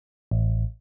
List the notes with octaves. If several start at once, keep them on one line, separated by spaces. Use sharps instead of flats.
A1